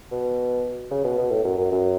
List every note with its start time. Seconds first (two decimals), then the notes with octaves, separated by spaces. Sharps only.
0.11 B2
0.91 C#3
1.04 B2
1.18 B2
1.31 A2
1.44 F#2
1.58 F#2
1.72 F#2